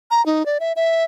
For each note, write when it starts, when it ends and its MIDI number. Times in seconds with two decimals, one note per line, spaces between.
0.11 0.24 82
0.26 0.45 63
0.46 0.58 74
0.60 0.73 76
0.76 1.04 76